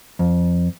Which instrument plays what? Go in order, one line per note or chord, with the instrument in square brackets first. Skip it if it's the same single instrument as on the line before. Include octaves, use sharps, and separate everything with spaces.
[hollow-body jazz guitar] F2